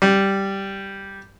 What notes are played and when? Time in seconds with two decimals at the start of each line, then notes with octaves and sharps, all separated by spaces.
0.02 G3